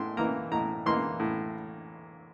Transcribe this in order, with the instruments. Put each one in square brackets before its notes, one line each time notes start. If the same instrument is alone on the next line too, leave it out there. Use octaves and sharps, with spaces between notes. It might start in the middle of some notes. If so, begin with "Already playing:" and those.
Already playing: [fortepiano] A2 C6
E3 A#3 A#5
A2 A#5
E3 A#3 C6
A2